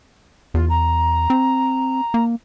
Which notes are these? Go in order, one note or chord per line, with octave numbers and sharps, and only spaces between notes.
E2 F4
A#5
C4
A#3